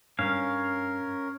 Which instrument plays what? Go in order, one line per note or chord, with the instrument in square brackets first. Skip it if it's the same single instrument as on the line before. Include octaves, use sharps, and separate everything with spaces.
[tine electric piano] G2 [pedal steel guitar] C#4 F5 [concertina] A#4